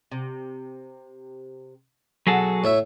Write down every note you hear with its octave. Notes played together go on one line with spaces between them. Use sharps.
C3
B2 F#3 F#4 G#4 A4
A2 C#5 E5